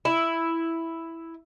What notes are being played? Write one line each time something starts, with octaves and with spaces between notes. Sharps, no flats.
E4